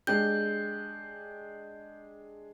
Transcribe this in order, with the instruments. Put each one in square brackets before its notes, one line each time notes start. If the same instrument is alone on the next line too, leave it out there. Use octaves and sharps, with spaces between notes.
[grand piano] G#3 D4 G4 [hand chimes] G6